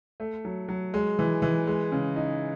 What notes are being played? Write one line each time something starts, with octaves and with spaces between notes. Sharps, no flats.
A3
F#3
F#3
G#3
E3
E3
G#3
C#3
D#4